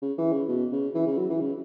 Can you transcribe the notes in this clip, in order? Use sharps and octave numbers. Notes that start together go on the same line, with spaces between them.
C#3
E3
C#3
B2
C#3
E3
C#3
F#3
E3
C#3